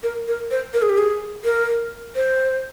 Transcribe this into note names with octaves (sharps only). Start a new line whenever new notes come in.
A#4
A#4
C5
A#4
G#4
G4
G#4
A#4
C5